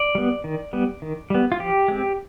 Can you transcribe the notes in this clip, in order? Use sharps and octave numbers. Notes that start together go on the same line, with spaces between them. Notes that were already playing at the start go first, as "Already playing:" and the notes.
Already playing: D5
G3 B3
D#3
G3 B3
D#3
G3 B3
F4
F3 G4
G#3 C4